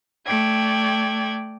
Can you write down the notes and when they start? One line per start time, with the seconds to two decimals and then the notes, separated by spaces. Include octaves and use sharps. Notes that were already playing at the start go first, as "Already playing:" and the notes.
0.25 A3 D5 G5 G#6